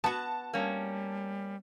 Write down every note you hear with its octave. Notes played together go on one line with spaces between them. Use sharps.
B3 F#4 A5
G3 A#3 C#4